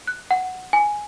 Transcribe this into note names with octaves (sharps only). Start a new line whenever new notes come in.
F#6
F#5
G#5